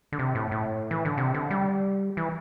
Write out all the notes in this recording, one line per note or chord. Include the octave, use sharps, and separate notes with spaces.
D3
C3
A2
A2
E3
D3
C3
D3
G3
E3